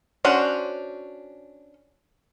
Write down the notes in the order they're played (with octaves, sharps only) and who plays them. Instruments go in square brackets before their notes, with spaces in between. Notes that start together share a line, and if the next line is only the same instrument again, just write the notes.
[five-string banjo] C#4 D4 F#4 C5